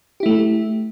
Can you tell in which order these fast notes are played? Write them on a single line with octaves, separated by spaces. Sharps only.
G4 E4 A3